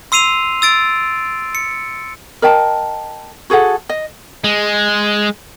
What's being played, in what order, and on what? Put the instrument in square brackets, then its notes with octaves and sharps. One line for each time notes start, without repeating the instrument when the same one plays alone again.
[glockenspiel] C6 E6 C7 D#7 F7
E6 A6 D7
C#7
[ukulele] A#4 D#5 G5 A5
F#4 G#4 A4 F#5
D#5
[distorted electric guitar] G#3